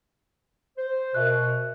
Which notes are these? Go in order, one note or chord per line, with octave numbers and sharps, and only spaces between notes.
C5
B2 A#4 E5 F#6